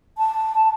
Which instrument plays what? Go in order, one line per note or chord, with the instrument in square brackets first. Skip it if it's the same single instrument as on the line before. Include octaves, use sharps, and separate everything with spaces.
[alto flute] A5